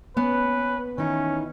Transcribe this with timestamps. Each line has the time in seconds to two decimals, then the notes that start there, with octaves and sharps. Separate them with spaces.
0.17 B3 C#4 B4
0.98 D#3 E3 C#4 D#4